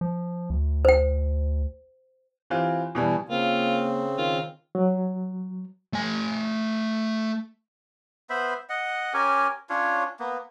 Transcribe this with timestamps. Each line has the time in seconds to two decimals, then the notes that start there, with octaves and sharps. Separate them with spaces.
0.01 F3
0.50 D2
0.85 C5 G5
2.50 E3 C4 F4 G4
2.95 B2 E3 G3
3.30 C#3 A#3 C4 F4
4.18 D#3 F4
4.75 F#3
5.93 A3 G#5
8.30 B3 C5 E5 B5
8.69 D#5 F#5
9.14 C#4 G4 A#4 G#5
9.70 C#4 D4 F4 C#5
10.19 A#3 B3